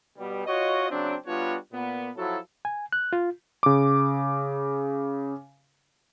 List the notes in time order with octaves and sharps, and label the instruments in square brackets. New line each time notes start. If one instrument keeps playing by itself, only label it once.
[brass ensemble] B2 G3
F4 F#4 C#5 D#5
C#3 F#3 C4 D4
G3 B3 D4 F4 F#4 C#5
A#2 B3
F3 F#3 E4 F#4 A4
[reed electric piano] G#5
F#6
F4
[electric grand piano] C#3 D6